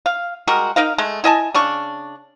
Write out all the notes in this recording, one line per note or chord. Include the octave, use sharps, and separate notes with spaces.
F5
G3 G#3 F#4 A#4
D#4 A#4 D#5 F5
G#3 A3
E4 D#5 G#5 A5
C#3 D4 C#6